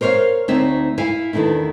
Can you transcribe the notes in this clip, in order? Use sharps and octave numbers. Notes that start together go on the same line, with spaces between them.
A#4 C5 C#5 D#5 F5
D2 C4 D#4 C#5 D5 E5
E4 E5 F5 G#5
E2 D#3 A3 D4 E4